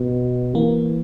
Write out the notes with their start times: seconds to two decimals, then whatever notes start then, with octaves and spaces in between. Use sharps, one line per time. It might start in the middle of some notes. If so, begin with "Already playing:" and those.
Already playing: B2
0.55 E3 A#3